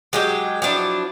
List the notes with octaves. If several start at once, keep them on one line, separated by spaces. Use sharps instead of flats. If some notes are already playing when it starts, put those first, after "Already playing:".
F#3 G#3 G4
F3 F#3 D4 E4